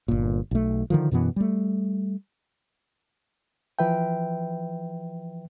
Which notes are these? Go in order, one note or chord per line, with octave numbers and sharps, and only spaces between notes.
G1 A#2
B1 A3
D3 D#3 F3
F#2 B2 E3 B3
G3 A3
E3 F3 B4 E5 G5